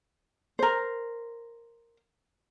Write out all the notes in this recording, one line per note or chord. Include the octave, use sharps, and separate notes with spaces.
A#4 C5